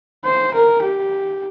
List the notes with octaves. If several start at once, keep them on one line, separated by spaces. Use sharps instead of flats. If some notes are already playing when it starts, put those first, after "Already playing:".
C5
A#4
G4